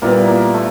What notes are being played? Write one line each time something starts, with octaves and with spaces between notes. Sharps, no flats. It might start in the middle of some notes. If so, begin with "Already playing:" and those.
A#2 G3 A#3 B3 E4
A#3
A3